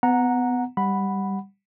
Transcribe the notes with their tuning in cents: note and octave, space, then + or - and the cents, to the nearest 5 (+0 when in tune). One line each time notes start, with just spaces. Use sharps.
B3 +25 F#5 -15 A#5 +0
G3 +0 F#5 +0 B5 +0